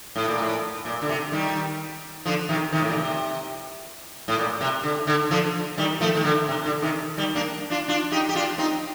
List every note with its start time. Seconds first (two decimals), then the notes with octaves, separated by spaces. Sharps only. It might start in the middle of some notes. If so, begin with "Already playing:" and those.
0.16 A2
0.28 A#2
0.41 A2
0.85 A#2
1.02 D3
1.09 C3
1.32 D#3 G3
2.26 D3 F3
2.49 C3 D#3
2.73 C3 D#3
2.82 A2
2.89 A#2
2.96 C3
4.28 A2
4.38 A#2
4.61 C3
4.83 D3
5.07 D3
5.31 D3 F3
5.77 D#3 G3
6.01 F3 A3
6.15 D#3
6.24 D3
6.48 C3
6.66 D3
6.82 C3 D#3
7.17 D#3 G3
7.35 A#3 D4
7.70 D4 F4
7.88 D4 F4
8.11 D#4 G4
8.29 G4
8.35 D4 F4
8.58 C4 D#4